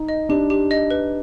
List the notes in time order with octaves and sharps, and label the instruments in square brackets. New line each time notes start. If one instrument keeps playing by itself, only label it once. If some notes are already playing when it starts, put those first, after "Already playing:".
Already playing: [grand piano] D#4
[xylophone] D#5
[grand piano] D4 [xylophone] G4
[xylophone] G4
D#5
B4